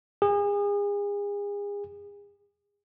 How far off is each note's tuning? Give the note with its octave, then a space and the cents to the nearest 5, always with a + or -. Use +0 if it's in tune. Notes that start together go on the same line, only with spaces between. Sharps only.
G#4 -35